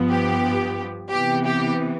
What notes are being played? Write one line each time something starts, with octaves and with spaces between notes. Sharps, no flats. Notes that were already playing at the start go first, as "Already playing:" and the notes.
Already playing: G2 F3 B3
G4
C3 E3 B3 G4
G4